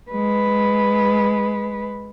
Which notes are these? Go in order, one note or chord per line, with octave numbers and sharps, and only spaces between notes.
G#3 B4